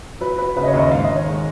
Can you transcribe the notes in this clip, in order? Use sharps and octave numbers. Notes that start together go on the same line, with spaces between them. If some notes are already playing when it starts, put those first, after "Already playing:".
F#3 B4
F#3 B4
C#3 B4
D#5
C#5
D#2
D#5
G#2 F5
D#5
D#3
C#5
G#3